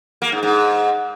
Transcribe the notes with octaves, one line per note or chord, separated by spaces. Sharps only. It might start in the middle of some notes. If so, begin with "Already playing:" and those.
A#3
G#2
G#2